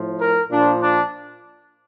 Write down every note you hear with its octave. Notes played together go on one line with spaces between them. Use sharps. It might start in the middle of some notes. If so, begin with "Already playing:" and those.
Already playing: A2 F3
A#4
A#2 F3 D4
D4